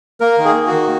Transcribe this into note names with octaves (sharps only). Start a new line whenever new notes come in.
A#3 A#4
D#3
G#4
A#3
F#4
D#3